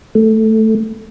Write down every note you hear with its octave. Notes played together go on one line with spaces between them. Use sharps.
A3